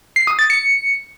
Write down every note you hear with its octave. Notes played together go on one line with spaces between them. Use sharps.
C7
D#6
A6
C#7